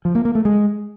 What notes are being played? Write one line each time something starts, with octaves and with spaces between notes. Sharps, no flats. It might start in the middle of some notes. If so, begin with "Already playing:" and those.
F3
A#3
A#3
A3
G#3